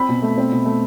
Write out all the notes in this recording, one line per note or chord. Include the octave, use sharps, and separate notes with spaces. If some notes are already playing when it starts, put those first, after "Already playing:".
Already playing: C4 B5
B2
A3
C4
B2
A3